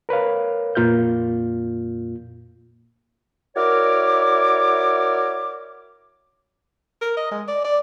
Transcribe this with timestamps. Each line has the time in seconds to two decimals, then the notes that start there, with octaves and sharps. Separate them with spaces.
0.09 A#4 B4 C#5 F5
0.75 F2 A#2 A#3 F4 F6 G6
3.56 E4 F#4 A#4 C#5 D5 D6
7.01 A#4
7.17 D#5
7.32 G#3
7.48 D5
7.65 D5